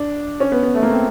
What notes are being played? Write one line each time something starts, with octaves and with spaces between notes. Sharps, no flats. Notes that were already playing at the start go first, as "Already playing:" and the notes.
Already playing: D4
C#4
B3
B3
A3
A#3
C4